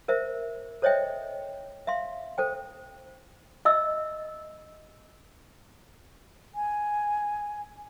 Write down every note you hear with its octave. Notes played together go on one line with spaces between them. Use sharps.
A#4 C5 E5
A4 C5 C#5 D#5 E5 G5
E5 F5 C6
A4 C5 G5
D#5 E5 E6
G#5